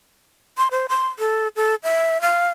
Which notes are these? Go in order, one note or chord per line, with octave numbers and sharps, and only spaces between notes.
C6
C5
C6
A4
A4
E5
F5